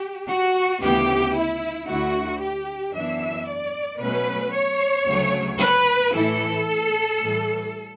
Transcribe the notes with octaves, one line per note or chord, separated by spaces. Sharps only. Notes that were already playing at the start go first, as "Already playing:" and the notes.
Already playing: G4
F#4
D2 C#3 E3 B3 G4
E4
D2 D3 A3 E4 F#4
G4
F#2 E3 B3 D4 E5
D5
B2 F#3 A3 C#4 B4
C#5
D2 C#3 F#3 A3
B4
A2 E3 A3 E4 A4
A2 E3 G3